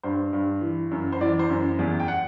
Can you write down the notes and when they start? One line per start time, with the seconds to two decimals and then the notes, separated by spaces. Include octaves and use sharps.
0.03 G2 C5
0.33 G2
0.61 E3
0.91 F#2
1.12 C5
1.21 E3 D5
1.39 C5
1.50 F#2
1.79 E2
2.00 G5
2.08 F#5